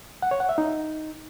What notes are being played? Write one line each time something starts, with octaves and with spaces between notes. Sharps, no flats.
F#5
C#5
F#5
E5
D#4